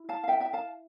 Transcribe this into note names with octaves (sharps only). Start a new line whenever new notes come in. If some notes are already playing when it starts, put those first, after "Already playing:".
Already playing: E4
F5 A5
F5
E5 G5
E5 G5
F5 A5